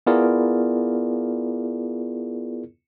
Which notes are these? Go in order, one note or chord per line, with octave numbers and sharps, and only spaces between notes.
B3 E4 F4 G#4 A#4 D5